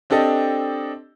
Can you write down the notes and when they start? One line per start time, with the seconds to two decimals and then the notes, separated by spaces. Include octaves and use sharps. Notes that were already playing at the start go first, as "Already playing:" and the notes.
0.10 C4 D4 G4 A4 D#5